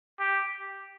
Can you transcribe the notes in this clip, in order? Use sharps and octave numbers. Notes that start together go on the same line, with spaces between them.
G4